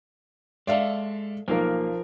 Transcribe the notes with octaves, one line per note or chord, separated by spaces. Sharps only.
G#3 A4 D5 E5 F5
B1 F3 A#3 A#4